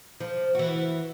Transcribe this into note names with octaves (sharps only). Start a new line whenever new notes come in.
F3
E3 F#4